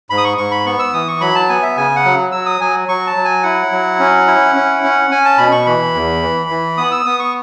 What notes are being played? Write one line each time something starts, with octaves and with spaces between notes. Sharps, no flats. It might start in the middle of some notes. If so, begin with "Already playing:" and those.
G#2 B5
D#6
C#6
G#2 C#6
B5
B3 C#6
E6
E3 D#6
C#6
F#3 B5
A5
B3 G#5
E5
C#3 G#5
F#5
F#3
F#3 E6
D#6
F#3 G#5
F#3 C#6
A5
F#3
G#5
E4 F#5
F#3
C#4
E4
C#4
C#4
C#4 G#5
A5
B2 B5
C#6
E3 B5
E2
E3
E3
B3 D#6
E6
B3 D#6
C#6